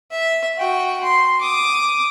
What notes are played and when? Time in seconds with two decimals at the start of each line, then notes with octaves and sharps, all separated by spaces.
0.11 E5
0.58 F#4 G5
1.03 C6
1.41 D6 D#6